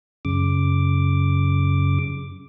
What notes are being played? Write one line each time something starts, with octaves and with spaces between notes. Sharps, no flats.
F#2 C#3 D6